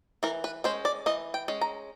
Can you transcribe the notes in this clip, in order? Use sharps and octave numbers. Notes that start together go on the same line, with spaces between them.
E3 A#4
B4
G#3 C#4 C5
D5
E3 D#5
G5
G#3 C#4
A#5